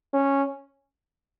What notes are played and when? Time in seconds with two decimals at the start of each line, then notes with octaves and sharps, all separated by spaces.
0.13 C#4